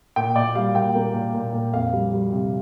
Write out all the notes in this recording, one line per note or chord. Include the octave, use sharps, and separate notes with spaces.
A#2 G5
A#2 D5
G3 F5
A#2 G5
A#3
A#2
A#2
A#2
F2 F5
G3
G3
C3